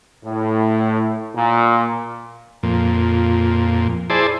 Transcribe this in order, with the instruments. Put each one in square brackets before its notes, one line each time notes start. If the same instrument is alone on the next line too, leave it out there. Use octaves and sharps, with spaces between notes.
[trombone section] A2
A#2
[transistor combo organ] F2 A#2
E4 G#4 C5 D5 A5